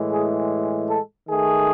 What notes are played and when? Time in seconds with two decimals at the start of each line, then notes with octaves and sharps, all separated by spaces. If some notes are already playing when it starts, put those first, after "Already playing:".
Already playing: A2 E3 G#3
0.12 G#4
0.90 A4
1.29 D#3 A3 G#4